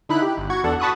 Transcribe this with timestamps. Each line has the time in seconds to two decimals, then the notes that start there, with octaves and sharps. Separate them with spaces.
0.09 D3 D#4 E4 B5 F#6
0.22 G4
0.37 G1
0.50 F#4 C#6 G#6
0.63 E2 D4 A4 F#5
0.80 F#4 A5 B5 C#6 D#6 F#6